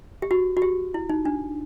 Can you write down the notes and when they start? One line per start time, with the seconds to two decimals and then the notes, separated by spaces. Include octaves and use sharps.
0.22 G4
0.31 F#4
0.57 F#4
0.62 G4
0.94 E4
1.09 D#4
1.25 D4